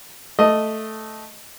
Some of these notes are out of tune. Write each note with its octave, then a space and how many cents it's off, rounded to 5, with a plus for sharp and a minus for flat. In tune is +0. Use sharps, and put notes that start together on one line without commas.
A3 +0 D#5 +0